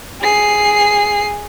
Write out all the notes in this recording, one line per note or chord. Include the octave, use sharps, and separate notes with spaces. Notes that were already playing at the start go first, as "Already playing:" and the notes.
G#4 C7